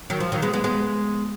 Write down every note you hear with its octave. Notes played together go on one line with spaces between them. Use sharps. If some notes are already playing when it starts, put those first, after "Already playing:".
D#3 F#3
F3
D#3 F#3
G#3 B3
G#3 B3
G#3 B3